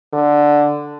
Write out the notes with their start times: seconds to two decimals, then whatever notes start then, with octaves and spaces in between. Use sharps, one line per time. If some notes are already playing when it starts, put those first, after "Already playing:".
0.13 D3